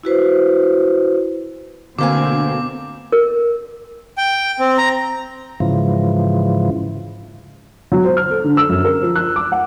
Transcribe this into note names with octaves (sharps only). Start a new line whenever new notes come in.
E4 F#4 B4 C5
D2 B2 D3 A#3 C4 G#5 D6
A#4
G5
C4
A#5
G#2 C#3 E3 F3
F#3
C5
F6
A4
D3
E6
F#2
A#4
F3
F#6
D6
F#5